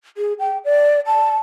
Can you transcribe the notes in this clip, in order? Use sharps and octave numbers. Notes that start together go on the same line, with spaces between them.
G#4
G5
D5
A5